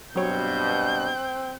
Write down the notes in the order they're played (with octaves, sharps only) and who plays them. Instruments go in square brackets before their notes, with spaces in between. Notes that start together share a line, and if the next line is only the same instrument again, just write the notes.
[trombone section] G2 B2 [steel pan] F#3 C#5 [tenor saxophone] C4 [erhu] G6